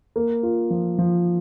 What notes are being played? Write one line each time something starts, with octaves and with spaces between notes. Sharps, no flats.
A#3
F4
F3
F3